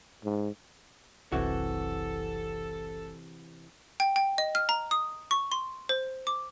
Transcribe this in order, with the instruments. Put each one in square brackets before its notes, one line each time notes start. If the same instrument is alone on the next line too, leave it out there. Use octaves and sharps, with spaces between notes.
[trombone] G#2
[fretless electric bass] F#1 C2 [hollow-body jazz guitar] C3 E3 F#4 [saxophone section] A4
[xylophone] G5
G5
D#5
F6
A#5
D#6
C#6
C6
C5
D6